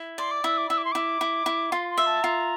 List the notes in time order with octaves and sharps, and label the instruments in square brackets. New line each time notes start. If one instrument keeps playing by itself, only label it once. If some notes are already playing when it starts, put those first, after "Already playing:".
Already playing: [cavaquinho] E4
[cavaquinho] D5 [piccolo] C6
[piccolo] D6
[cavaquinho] E4 [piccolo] E6
[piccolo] D6
[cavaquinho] E4 [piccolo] E6
[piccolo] D6
C6
[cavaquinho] E4 [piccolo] D6
[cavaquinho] E4
E4
[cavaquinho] F4 [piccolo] C6
[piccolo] C6
[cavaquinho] E5
[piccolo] A5
[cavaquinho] F4 [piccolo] A#5